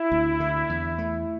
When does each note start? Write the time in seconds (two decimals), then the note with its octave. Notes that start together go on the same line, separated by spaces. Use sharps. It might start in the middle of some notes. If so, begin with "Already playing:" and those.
Already playing: E4
0.12 D2
0.40 D3
0.69 E2
0.98 A3